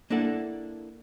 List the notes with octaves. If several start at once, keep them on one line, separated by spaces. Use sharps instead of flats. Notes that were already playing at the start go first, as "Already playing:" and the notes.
A#3 D4 E4 A4 F#5